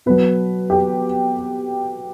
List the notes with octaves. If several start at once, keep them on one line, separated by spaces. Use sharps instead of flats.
B2 F#3 B4
G4